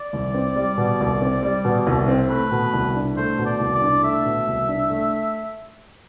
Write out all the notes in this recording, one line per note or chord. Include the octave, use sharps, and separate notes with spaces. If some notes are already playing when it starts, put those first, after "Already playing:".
Already playing: D5
C2
C4
G3
B2
C2
C4
G3
B2
C2
C4
A3 B4
B2
C2
D4
A3 C5
B2
D5
C2
D5
D4
A3 E5
B2
C2
D4
A3